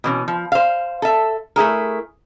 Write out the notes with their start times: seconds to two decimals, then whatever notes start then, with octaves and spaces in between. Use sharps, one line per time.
0.04 B2 E3 C#4
0.28 F3
0.52 C5 F5
1.02 A4 E5
1.56 A3 E4 G#4 A#4